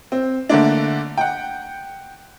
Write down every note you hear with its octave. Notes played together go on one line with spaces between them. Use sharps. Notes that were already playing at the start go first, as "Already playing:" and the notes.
C4
D3 A3 A#3 D4
F#5 G5